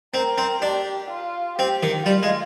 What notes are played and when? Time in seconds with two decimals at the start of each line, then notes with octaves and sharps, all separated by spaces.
0.14 C4 A#4
0.38 C4
0.62 D4 G4
1.10 F4
1.58 C4 G4
1.83 D#3
2.06 G3 F4
2.23 G#3